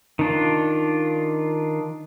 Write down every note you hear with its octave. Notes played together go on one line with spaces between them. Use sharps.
D#3 D4 F4